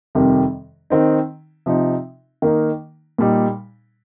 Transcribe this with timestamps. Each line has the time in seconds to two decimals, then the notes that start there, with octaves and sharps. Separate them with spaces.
0.15 F2 C3 D#3 G3
0.90 D#3 C4 D#4
1.66 C3 F3 D#4
2.42 D#3 A#3 D#4
3.18 A#2 G3 D#4